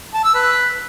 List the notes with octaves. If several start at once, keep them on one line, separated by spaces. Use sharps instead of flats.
A5
E6
B4